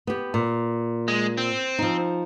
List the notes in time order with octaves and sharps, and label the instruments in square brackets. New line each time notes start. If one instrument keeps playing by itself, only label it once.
[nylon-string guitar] B3 G4
A#2
[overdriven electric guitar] G#3
C4
[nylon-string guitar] F3 D#4